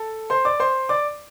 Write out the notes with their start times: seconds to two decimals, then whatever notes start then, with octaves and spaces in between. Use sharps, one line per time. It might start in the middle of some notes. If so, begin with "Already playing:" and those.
Already playing: A4 A5
0.30 C5 C6
0.45 D5 D6
0.60 C5 C6
0.89 D5 D6